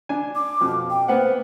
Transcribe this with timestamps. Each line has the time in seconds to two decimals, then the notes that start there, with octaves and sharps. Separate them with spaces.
0.09 D4 G#5
0.35 D6
0.61 F2 B2 F3
0.91 G5
1.08 A#3 B3 C5 F#5